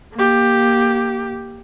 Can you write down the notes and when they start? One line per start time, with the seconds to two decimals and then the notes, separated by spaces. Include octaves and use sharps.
0.15 A#3 G4